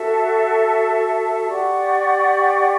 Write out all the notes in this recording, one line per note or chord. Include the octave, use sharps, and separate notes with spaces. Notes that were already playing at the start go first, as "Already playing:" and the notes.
Already playing: F#4 A4 E5 A5
G4 D5 F#5 C#6